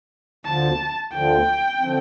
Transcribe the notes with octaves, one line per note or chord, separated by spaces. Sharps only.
D2 D3 F3 A5
D2 D3 F3 G5
D3 F3 C4